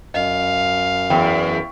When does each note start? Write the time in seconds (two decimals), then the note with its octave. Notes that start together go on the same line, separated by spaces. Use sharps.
0.14 F#2 D#5 F5
1.10 E2 G5 B5